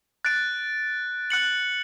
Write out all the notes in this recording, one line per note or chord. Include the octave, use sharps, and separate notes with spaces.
F#6 A6 D7
F#6 C#7 F#7